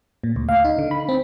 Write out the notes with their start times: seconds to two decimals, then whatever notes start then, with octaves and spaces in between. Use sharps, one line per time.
0.24 A#2
0.36 D2
0.49 F5
0.65 D#4
0.79 D3
0.91 B5
1.09 C4